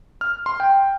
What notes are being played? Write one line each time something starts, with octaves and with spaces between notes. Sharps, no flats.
F6
C6
G5